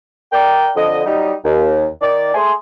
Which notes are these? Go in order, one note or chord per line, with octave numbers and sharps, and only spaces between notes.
A#4 D5 G5
F2 D3 D#5
F#3 G3 D#4
D#2
D#3 D5
A3 G#4 G#5 C6